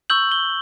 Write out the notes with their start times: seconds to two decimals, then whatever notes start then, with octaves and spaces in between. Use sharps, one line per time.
0.10 C#6 E6 G6 F#7
0.32 G7